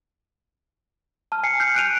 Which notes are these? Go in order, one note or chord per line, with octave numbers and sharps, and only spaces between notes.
A5 F6
G#5 C7 C#7
F6 G6 C7
F#6 D7 D#7 F7